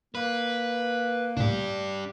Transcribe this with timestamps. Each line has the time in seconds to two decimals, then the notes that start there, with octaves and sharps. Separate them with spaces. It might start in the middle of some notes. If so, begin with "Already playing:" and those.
0.15 A#3 B4
1.37 C#2 A2 D4 G4